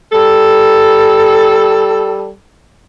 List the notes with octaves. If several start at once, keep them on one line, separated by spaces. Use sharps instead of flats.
G3 A4